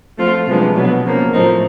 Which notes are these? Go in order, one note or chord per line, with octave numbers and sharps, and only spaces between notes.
F3 A3 C4 F4
C3 F3 G#3 B3 D4
B2 F#3 B3
C#3 F3 A#3
A2 F3 A3 C4 D#4